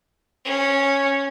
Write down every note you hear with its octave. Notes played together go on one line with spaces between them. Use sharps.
C#4